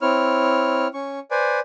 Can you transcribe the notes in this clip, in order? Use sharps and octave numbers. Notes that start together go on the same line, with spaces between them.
C4 E4 C#5 F6
C#4 C#6
B4 C5 D5 G#5